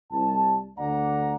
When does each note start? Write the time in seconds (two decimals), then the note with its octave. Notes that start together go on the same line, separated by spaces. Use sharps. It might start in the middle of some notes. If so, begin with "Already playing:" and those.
0.12 C2 A5
0.78 D2 D3 D5 F#5 A#5